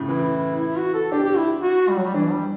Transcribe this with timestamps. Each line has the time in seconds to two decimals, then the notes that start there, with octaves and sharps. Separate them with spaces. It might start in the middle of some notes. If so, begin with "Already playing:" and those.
Already playing: A2 C#3
0.09 E3 E4
0.60 E4
0.77 F#4
0.94 A4
1.12 D4 G4
1.24 G4
1.37 E4
1.63 F#4
1.89 G3
1.96 F#3
2.04 G3
2.14 E3 D4
2.31 G3